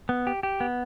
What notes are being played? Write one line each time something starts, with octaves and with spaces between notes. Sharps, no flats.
B3
G4
G4
B3